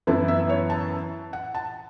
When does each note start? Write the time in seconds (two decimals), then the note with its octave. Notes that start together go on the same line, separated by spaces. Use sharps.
0.07 F#2 E3 B3 E4 A5
0.28 E5
0.49 C#5
0.70 A5
1.33 F#5
1.54 A5